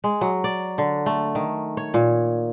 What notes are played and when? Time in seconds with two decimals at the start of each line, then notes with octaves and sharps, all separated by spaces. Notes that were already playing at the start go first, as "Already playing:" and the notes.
0.04 G#3
0.21 F#3
0.44 D5
0.78 D3
1.06 A3
1.35 D#3
1.77 C#5
1.94 A#2